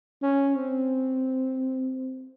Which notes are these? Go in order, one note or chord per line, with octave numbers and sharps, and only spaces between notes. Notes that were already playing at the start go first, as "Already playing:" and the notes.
C#4
C4